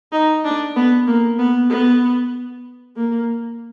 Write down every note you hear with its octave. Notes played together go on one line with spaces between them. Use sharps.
D#4
D4
B3
A#3
B3
B3
A#3